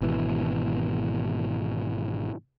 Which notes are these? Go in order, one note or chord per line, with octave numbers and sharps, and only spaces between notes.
G#1 B2 E3